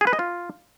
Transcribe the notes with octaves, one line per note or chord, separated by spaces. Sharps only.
G#4
B4
D#5
F4